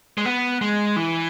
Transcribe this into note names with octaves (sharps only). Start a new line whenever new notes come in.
G#3
B3
G#3
E3